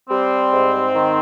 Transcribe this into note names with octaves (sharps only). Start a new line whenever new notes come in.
G3 C4
G#2
D#3